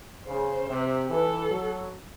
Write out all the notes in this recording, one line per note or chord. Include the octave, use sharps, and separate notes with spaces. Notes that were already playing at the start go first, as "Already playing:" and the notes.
C#3 C5
C3
E3 A4
F#3